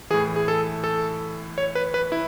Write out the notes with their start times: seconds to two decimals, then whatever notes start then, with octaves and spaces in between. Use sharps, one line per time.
0.10 A2 E3 G#4
0.36 G#4
0.48 A4
0.84 A4
1.58 C#5
1.75 B4
1.94 B4
2.12 E4